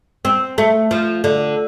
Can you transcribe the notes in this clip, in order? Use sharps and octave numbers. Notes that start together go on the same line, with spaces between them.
C4
A3
F3
D3